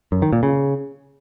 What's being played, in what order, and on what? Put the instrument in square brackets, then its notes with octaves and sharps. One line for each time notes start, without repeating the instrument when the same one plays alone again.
[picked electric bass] F#2
D#3
A#2
C#3